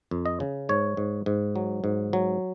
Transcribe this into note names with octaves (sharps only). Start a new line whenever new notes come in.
F2
D#5
C#3
G#2 C#5
G#2
G#2
F#3
G#2
F#3